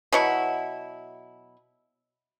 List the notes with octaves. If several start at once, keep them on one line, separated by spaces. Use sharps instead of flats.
B2 F#3 E4 C#6